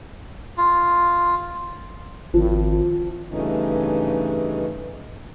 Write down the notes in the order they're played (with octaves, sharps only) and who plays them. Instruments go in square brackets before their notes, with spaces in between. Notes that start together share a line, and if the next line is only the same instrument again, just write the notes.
[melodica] F4
[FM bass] G#1 [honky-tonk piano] F3
[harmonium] G2 C#3 E3 A3 C#4 D#4